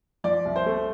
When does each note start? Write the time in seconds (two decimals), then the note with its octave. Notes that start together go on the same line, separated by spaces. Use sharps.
0.24 F3 D5
0.45 C2
0.56 C5
0.66 A3